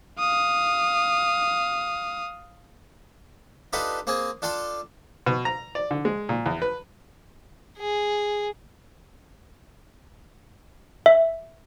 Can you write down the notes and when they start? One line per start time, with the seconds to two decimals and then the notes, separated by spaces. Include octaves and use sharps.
0.19 F5 D#6
3.73 D4 D#4 F4 G4 A4 B4
4.07 A#3 C4 G#4
4.42 D4 F4 A4 G5 C6
5.26 B2
5.45 A#5
5.75 D5
5.91 D3
6.05 G#3
6.29 A#2
6.46 E2
6.62 B4
7.78 G#4
11.06 E5